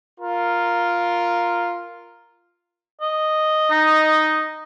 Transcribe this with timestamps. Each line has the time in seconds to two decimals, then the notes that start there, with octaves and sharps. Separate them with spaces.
0.20 F4 A#4
3.01 D#5
3.71 D#4